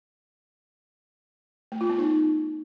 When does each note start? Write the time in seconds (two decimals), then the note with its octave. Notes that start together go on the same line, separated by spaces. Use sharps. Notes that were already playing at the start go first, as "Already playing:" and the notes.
1.72 A3
1.81 F4
1.90 B3
1.98 D#4